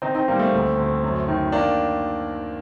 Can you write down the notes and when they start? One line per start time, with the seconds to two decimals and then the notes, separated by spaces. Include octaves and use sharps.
0.02 D#3 C4 D#4
0.15 C4 D#4
0.28 D#3 G3 A#3
0.39 A3 C4
0.53 D2
0.77 D2
1.03 F#2
1.28 D#3
1.52 D#3 A#3 D4